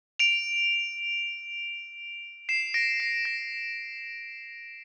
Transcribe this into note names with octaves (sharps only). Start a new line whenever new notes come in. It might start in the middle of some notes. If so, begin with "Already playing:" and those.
D7 F7
C7 E7
A#6 D7
C7
A#6